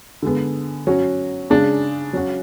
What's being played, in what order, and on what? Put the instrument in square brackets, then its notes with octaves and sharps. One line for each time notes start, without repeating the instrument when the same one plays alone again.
[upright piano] D3 G#3 B3
F#3 C#4 F#4
C#3 G#3 D4
F#3 C#4 F#4